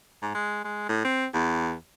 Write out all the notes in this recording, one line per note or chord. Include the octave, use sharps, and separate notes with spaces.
G#2
G#3
G#3
A2
C4
E2